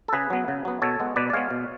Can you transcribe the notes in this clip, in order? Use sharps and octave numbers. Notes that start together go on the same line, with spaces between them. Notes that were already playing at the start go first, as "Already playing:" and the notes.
A4
C#3 G#4 B4
F#3 B3
C#3
F#3 B3
B2 A4 C#5
G#3 B3
B2 B4 D5
D5
G#3 B3 C#5 F5
B2